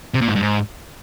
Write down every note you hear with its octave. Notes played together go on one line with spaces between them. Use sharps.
C3
A#2
G#2
G2
G#2